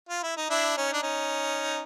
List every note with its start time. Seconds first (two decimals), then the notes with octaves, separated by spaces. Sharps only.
0.09 F4
0.23 E4
0.37 D#4
0.50 D4 E4
0.77 C#4 D#4
0.94 D4
1.02 C#4 D#4